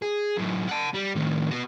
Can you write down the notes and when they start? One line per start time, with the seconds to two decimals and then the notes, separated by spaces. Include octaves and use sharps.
0.02 G#4
0.38 F#2 A2
0.68 F#5 A5
0.94 G3
1.15 A2 D#3
1.51 F#4 B4